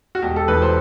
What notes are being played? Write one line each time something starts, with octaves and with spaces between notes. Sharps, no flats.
F#4
E1 G4
A4
E2 B4
C5